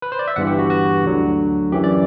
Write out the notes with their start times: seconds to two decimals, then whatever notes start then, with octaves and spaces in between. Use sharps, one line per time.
0.02 B4
0.12 C5
0.19 D5
0.28 E5
0.36 G1 G2 E3 F#5
0.47 G4
0.59 F#4
0.70 F#4
1.04 D2 D3 F#3
1.72 F#2 E3 G4
1.84 D5